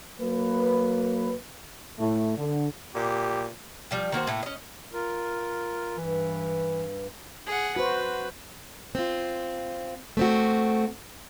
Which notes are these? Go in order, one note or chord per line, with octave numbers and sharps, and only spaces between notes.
F#3 A#3 B4
A2 A3
D3
A#2 G4
F3 G3 G4
D#3 A#3 F#4 C5
A2 A3 A#3
C#4 D#5
F4 A#4
G2 E3
G#4 F#5
F#4 B4 C5
C4 F4
A3 C4 F#4